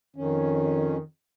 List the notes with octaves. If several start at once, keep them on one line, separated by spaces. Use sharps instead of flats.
F2 D#3 C#4